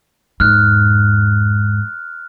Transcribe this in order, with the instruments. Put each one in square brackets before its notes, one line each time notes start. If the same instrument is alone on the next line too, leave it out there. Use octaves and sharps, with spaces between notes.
[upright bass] E2 G#2 [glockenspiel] F6 F#6